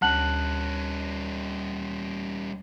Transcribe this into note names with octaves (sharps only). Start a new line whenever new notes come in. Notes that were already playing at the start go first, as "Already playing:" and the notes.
D2 G3 C#4 A5 F#6 F#7